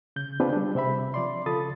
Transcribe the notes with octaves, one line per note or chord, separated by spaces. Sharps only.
C#3 G6
B3 C4 D4 F4 G#4 B4
G3 D4
C3 C4 E5 B5
F3 D5 C6
C#3 F4 A4 B5 D#6 A6